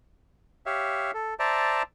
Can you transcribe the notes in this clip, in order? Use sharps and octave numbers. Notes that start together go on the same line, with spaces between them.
G4 C#5 E5 F5
A4
C5 D5 E5 A5 A#5